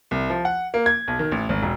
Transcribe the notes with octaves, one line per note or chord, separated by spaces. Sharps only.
C2
F3
F#5
A#3
G#6
B1
D#3
A1
G#1
E1